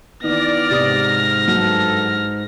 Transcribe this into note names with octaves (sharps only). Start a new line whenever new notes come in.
D#3 E3 B3 D5 F6 A#6
G#2 C3 D#6
G2 F#3 A4